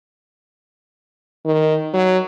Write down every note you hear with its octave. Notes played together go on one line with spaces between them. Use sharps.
D#3
F#3